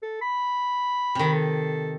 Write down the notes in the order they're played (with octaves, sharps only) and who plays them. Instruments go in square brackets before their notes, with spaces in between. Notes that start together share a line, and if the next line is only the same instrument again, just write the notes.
[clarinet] A4
B5
[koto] C3 D#3
[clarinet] A4